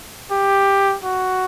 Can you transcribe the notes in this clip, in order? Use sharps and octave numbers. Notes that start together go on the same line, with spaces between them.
G4
F#4